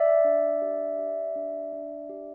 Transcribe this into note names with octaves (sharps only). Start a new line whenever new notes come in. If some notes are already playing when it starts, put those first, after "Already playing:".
Already playing: D5 E5
D4
G4
G4
D4
D4
G4